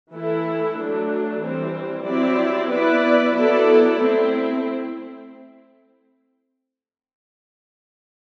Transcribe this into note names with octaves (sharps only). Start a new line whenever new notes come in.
E3 A3 E4 A4
F#3 A3 D4
E3 G3 C4
F#3 C4 E4 G4 D5
B3 E4 B4 D5
F#3 B3 E4 A4 D5
A3 C4 E4